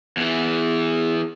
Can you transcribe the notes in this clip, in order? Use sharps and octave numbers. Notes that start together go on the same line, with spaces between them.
E2 E3